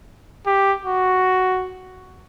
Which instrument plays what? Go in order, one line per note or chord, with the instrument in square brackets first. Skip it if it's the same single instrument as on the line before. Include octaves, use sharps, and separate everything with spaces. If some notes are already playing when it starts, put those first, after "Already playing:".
[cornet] G4
F#4